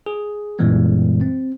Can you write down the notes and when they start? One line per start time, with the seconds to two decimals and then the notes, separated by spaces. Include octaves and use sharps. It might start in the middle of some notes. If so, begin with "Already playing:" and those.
0.06 G#4
0.59 F#2 A#2 E3 G3 G#3 B3
1.21 C4